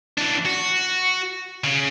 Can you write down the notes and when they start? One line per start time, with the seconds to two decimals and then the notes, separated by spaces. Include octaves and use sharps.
0.17 E3 D4
0.45 F#4
1.64 C#3